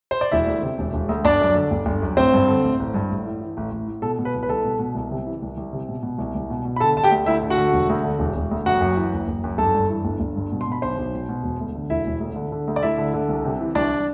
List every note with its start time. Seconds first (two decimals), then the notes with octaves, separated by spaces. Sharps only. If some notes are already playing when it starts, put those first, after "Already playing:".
0.11 C5
0.21 D5
0.32 E1 E4 E5
0.47 D2
0.63 C3
0.78 E1
0.93 E1
1.09 D2
1.25 G1 D4 D5
1.41 F#2
1.55 D3
1.71 G1
1.86 G1
2.02 F#2
2.17 A1 C4 C5
2.33 G2
2.48 D3
2.63 A1
2.80 A1
2.94 G2
3.10 A1
3.26 A2
3.41 E3
3.57 A1
3.71 A1
3.87 A2
4.02 B2 A4
4.19 B2
4.25 B4
4.34 C2
4.43 B4
4.49 C2 A4
4.64 B2
4.79 B2
4.95 C2
5.11 C3
5.26 E3
5.42 C2
5.57 C2
5.73 C3
5.89 B2
6.03 B2
6.18 C2
6.35 C2
6.50 B2
6.65 B2
6.76 B5
6.80 D3 A4 A5
6.97 D3 A5
7.03 G4 G5
7.11 D2
7.26 D2 E4 E5
7.43 D3
7.50 F#4 F#5
7.57 D3
7.73 E1
7.89 D2
8.04 D3
8.19 E1
8.36 E1
8.51 D2
8.66 F#1 F#4 F#5
8.81 F#2
8.97 E3
9.13 F#1
9.28 F#1
9.44 F#2
9.58 G1 A4 A5
9.74 G2
9.90 E3
10.05 G1
10.20 G1
10.36 G2
10.52 B2
10.61 C6
10.67 B2 B5
10.82 B1 C5 C6
10.97 B1
11.13 B2
11.29 B2
11.43 E1
11.60 D2
11.75 D3
11.90 E1 E4 E5
12.06 E1
12.21 D2
12.36 D3
12.52 D3
12.67 D2
12.76 D5
12.83 D2 E4 E5
12.98 D3
13.14 D3
13.29 C2
13.45 C3
13.60 E3
13.75 C2 D4 D5